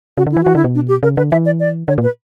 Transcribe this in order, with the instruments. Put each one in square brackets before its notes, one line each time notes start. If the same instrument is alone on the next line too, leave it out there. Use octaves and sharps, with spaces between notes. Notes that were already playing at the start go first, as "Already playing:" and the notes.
[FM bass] C#3 [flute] F#4
[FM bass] D3
[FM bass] E3 [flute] E4
[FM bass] E3 [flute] F#4
[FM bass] D3 [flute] E4
[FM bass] B2
[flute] D4
G4
[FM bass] C#3 [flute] A#4
[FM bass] D3 [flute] B4
[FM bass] E3 [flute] E5
[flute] D5
D5
[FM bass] D3 [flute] C#5
[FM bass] A#2
[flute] B4